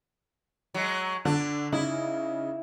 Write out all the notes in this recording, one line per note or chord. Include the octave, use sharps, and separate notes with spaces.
F#3 G#3
D3 D4
C#3 D#4 E4